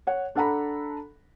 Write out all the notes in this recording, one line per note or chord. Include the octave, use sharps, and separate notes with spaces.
C#5 F#5
D4 A4 F#5 A#5 B5